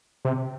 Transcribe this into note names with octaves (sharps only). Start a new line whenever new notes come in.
C3